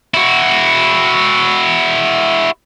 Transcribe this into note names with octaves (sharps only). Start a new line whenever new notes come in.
E4 F#4